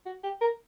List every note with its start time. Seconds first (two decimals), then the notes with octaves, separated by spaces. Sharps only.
0.06 F#4
0.24 G4
0.41 A#4